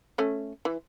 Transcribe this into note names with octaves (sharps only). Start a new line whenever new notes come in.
A3 C#4
E3